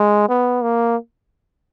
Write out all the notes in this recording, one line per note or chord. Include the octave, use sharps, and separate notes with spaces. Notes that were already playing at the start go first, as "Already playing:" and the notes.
Already playing: G#3
B3
A#3